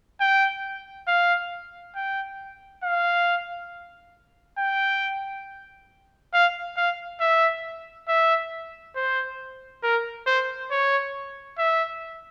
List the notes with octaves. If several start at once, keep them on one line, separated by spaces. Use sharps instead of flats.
G5
F5
G5
F5
G5
F5
F5
E5
E5
C5
A#4
C5
C#5
E5